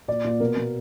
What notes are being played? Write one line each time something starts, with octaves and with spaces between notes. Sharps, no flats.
A#2 D5
A#2
B2 A#4
B2